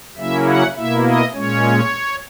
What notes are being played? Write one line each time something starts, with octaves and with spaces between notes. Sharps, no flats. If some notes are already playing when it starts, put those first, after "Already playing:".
C#3 F#3 A#3 C#4 E4 E5
F#5
B2 A#3 E4 E5
D#5
A#2 G#3 C#4 C#5